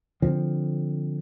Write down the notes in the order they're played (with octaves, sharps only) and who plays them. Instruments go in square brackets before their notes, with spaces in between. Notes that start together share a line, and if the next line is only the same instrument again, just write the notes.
[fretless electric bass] D3 F3 C4